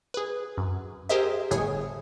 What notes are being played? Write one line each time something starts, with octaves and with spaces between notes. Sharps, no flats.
G#4 B4
F#2
G4 G#4 A#4 C5 D#5 E5
G1 A2 G#4 C#5 G#5 D#6